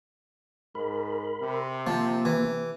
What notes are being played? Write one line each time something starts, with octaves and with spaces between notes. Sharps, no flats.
G#2 A#4 B5
C3
F3 A#3
E3